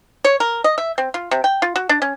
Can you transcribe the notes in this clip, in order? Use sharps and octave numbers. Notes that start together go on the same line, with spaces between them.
C#5
A#4
D#5
E5
C4
F4
C3
G5
F4
F#4
D4
C#4